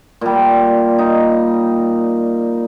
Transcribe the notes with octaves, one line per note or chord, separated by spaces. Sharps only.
A#2 G3
D#4